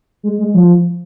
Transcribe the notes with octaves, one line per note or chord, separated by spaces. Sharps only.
G#3
G#3
F3